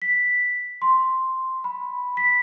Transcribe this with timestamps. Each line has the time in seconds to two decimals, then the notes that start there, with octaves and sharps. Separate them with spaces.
0.02 B6
0.82 C6
1.64 B5
2.17 B6